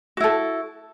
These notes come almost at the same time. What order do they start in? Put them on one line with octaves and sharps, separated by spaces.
F#4 E4 A4